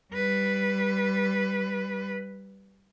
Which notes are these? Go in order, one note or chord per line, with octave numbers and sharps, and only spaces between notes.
G3 B4